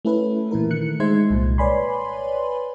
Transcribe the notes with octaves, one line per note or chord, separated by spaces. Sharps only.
A3 C#4 E4 A4 B4
A#2 E3 E4 A#4
D#3 A3 F#6 C#7
G#3 D#4 C5 E5 C6 G#6
C2 A#2
B4 C#5 D5 G#5 B5 C6